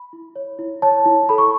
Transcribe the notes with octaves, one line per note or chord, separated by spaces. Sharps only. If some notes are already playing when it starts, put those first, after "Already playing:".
Already playing: B5
E4
C#5
E4
C#5 A5
E4
A4 B5
C#6